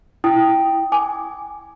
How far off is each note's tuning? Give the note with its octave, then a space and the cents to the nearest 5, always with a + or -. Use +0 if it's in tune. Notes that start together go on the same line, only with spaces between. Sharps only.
E4 +0 G5 +0 D#6 +0
G#5 +5 D6 +0